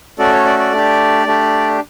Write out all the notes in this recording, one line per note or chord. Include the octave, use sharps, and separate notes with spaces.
A3 C#4 F#4 A4 D5
C#5
D5
D5
A3 D4 G4
A3 D4 G4